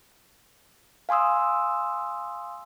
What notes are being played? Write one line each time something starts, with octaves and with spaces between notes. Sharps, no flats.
F5 G#5 C6 D#6 E6